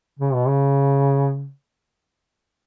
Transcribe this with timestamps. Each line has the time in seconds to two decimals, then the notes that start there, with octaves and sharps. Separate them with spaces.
0.19 C#3
0.34 B2
0.48 C#3